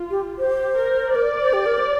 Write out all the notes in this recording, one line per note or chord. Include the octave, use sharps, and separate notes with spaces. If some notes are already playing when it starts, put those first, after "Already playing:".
Already playing: F4
G4
G4 C5
A#4
A#4 D5
C5
G4
A#4
C5